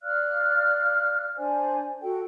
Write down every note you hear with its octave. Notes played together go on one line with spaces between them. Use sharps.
D5 F5 F6 F#6
D4 C5 D5 G#5
F#4 A4 G5